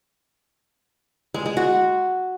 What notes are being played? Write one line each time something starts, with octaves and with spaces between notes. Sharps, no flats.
G#3
G#3
F#4